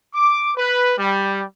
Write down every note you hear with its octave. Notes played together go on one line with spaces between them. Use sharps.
D6
B4
G3